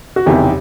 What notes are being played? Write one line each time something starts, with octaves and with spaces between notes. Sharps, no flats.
F#4
F#1 E2 C3 D#3 G4
G4